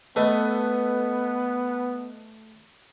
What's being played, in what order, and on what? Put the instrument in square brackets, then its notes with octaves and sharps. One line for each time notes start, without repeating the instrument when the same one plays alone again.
[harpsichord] A3 [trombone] B3 [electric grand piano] A4 B4 D#5